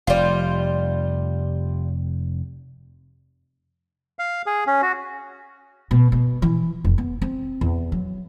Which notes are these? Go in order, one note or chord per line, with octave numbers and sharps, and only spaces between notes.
F1 G3 F4
F5
G#4
C#4
F#4
B2
B2
E3
F1
B3
C4
E2
F#3